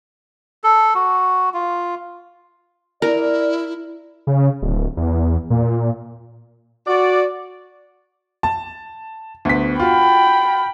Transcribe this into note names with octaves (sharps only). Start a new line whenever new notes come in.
A4
F#4
F4
E4 A#4 D5
C#3
D1
E2
A#2
F#4 D5
A5
D2 B3 B6
F4 F#4 G5 B5